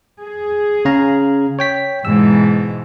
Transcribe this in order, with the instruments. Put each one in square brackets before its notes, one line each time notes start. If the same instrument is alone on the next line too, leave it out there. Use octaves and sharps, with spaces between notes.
[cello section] G#4
[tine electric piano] C#3 F5 A#5
C#5 G5 B6
[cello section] G#2 B2 E3 [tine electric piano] E6